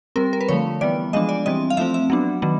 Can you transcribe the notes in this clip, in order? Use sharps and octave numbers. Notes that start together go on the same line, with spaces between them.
G3 C4 A#4
A#4
B4
D3 F3 A3 C#5
E3 G3 B3 D5
F3 G#3 B3 D4 D#5
D5
E3 G3 C4 D#5
F5
F3 A3 C4 E5
E5
F#3 B3 D4
D#3 F#3 B3 D4